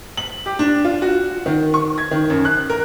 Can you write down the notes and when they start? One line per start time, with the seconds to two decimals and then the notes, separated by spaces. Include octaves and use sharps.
0.17 F#7
0.46 G4
0.59 D4
0.85 F4
1.02 F#4
1.46 D#3
1.74 C#6
1.98 G#6
2.11 D#3
2.30 F#2
2.45 F#6
2.70 A#4